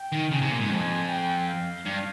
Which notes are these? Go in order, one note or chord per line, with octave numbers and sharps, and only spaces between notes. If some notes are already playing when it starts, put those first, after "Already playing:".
Already playing: G5
D#3
C#3 G#5
C3
A#2
G#2
F2 G#5
G5
F5
G2